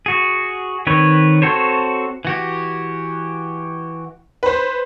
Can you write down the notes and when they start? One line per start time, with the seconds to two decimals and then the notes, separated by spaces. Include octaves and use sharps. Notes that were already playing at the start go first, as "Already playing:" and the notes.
0.06 F#4 G#4
0.87 D#3 C4 B4 C#5
1.42 C4 F#4 A4 C5 C#5
2.25 E3 F#4 G4
4.43 B4 C5